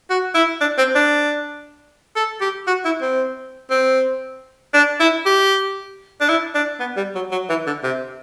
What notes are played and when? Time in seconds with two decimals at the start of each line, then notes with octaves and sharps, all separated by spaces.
0.10 F#4
0.34 E4
0.61 D4
0.78 C4
0.95 D4
2.16 A4
2.41 G4
2.67 F#4
2.85 E4
3.01 C4
3.70 C4
4.74 D4
5.00 E4
5.26 G4
6.21 D4
6.29 E4
6.55 D4
6.80 B3
6.97 G3
7.15 F#3
7.32 F#3
7.49 E3
7.66 D3
7.83 C3